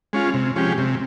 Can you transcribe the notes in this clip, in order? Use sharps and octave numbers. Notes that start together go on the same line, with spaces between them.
G#3 C#4 F4
C3
F3 G#3 C#4 G4
C3